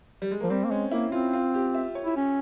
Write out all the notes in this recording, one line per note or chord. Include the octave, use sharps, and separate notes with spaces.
G3
G#3
F3 A#3
G3 C4
A#3
G#3 C#4
A#3 E4
C4 F4
F4
G4
E5
C#5
E4
C#4